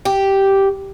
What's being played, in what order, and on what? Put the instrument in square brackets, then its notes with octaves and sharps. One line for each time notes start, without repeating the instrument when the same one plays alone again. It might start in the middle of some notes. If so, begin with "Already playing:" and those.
[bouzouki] G4